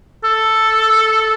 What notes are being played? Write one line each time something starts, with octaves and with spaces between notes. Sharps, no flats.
A4